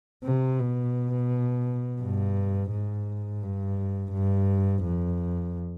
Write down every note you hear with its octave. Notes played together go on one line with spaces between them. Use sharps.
C3
B2
G2
G#2
G2
G2
F2